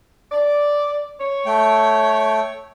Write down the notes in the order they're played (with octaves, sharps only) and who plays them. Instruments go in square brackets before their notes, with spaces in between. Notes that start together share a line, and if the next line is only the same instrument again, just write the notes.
[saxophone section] D5
C#5
[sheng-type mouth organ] A3 G5